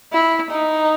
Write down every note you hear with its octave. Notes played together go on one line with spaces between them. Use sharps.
E4
D#4